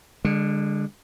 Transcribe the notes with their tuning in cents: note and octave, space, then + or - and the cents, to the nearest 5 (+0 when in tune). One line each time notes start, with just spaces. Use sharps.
D3 +5 G#3 -30